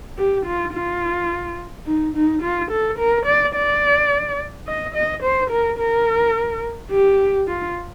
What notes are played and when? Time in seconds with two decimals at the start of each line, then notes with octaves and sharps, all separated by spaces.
0.18 G4
0.46 F4
0.74 F4
1.87 D#4
2.15 D#4
2.42 F4
2.71 A4
2.99 A#4
3.26 D5
3.55 D5
4.67 D#5
4.95 D#5
5.23 C5
5.50 A#4
5.79 A#4
6.90 G4
7.48 F4